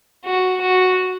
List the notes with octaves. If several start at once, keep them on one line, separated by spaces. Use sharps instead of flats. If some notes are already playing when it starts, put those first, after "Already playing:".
F#4
F#4